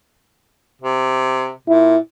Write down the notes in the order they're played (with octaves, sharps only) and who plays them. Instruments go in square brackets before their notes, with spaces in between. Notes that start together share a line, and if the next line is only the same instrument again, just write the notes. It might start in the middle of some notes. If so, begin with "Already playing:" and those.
[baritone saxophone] C3
[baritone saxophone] A#2 [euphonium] E4